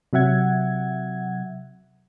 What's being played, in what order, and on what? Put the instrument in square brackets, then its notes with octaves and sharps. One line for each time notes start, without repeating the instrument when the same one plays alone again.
[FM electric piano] C3 F#3 E5 F#5 G#6